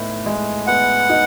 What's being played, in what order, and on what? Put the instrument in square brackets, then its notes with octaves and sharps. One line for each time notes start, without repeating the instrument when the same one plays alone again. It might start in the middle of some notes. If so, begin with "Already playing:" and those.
Already playing: [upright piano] A2 B3 D#4
G#3
[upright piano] B3 [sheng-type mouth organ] F#5
[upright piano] D#4